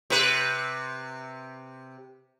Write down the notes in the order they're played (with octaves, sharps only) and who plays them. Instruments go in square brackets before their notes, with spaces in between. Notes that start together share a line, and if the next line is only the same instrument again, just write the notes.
[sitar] C3 B4